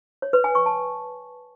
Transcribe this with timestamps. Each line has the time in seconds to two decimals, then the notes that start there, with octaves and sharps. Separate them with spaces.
0.22 C#5
0.33 B4
0.44 G#5
0.55 C#6
0.66 A5